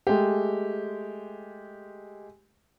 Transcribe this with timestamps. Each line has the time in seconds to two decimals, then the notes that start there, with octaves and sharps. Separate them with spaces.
0.07 G#3 A3 G4